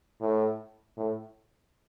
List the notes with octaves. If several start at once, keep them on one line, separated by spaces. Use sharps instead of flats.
A2
A2